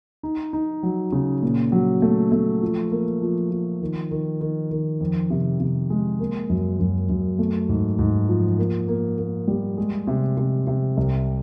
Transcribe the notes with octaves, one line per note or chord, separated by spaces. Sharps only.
D#4
D#4
F#3
C#3
A#2
F#3
A3
A3
F3
A#3
F3
F3
D#3
D#3
D#3
D#3
F2
C3
C3
G#3
A#3
F#2
F#2
F#2
A3
G#2
G#2
F3
A#3
A#3
A#3
G3
G#3
C3
C3
C3
C2